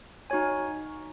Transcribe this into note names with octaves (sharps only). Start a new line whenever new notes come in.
D#4 F#4 C#5 G#5